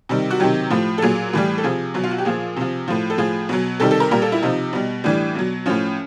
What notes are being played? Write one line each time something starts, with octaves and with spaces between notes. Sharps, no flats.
C3 D#3 G3
F#4
C3 D#3 F#3 G4
A2 F3
A4
A#2 F#3 G#4
A2 E3 G3
A4
C3 F3 G#4
B2 F#3
F4
F#4
G4
A#2 F3 G#4
C3 F3
A2 F3
A4
A2 F3 G#4
B2 F#3
C3 D#3 G3 A4
A4
A#4
A#2 G3 A#4
A4
E4
C3 F3 D#4
B2 G3
A2 E3 G3 D4
B2 F#3
A2 F3 C#4